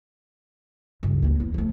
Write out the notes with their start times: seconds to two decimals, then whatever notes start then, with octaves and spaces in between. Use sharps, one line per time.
1.03 C#2 G2
1.22 D2 A#3
1.40 E2 C#4
1.54 F3 A3